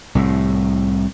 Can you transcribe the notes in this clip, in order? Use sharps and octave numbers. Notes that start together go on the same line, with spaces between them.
C2 A2